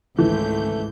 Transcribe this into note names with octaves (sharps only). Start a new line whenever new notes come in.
G#1 C#2 E3 A3 G6